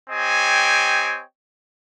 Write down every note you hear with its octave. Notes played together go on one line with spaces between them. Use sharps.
C4 G4 C#5 D#5 G5 G#5